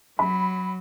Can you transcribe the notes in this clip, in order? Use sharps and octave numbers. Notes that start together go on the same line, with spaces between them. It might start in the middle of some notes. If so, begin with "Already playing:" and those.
F#3 B5